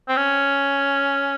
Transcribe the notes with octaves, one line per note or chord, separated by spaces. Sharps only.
C4
C#4